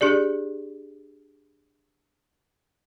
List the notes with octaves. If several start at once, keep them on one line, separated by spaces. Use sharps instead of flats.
D4 G4 G#4 D5